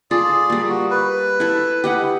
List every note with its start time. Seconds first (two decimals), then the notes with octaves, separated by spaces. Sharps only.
0.11 F4 G#4 A4 D5
0.50 G3 A#3
0.69 F#4
0.90 B4
1.40 E4 A4
1.84 G4 D#5 F#5